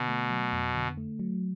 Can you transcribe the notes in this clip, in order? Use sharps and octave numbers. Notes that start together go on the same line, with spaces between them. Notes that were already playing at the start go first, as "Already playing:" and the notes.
Already playing: B2 D3
A3
F#3
F2
D3
A3
F#3